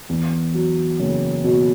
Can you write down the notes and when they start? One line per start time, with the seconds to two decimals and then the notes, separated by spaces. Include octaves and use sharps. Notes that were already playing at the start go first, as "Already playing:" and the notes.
0.09 E2
0.54 F#3
1.00 F#1
1.44 B2